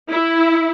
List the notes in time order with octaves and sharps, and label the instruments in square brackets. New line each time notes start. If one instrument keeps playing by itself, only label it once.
[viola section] E4